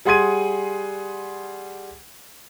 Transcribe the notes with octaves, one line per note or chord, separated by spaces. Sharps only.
G3 G#4 F#5 C6 G#6 D#7